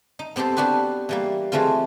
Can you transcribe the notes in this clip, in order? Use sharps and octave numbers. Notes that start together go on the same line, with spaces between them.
D#4
B3 C4 G4 A4 C5
B3 D4 F#4 G4 B4
E3 G3 A#3
E3 G#3 A3 C4 F4